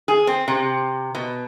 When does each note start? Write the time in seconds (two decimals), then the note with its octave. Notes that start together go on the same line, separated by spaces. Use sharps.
0.08 G#4
0.27 C4
0.48 C3
1.15 B2